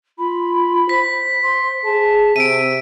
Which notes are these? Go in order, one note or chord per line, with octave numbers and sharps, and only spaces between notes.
F4 B5
C5 B6
C6
G#4 A5
C3 C4 E5 D7 D#7